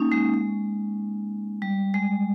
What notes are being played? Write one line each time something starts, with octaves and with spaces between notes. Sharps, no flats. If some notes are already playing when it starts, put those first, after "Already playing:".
Already playing: A#3 C#4 D#4
G#3
G#3
G3
G#3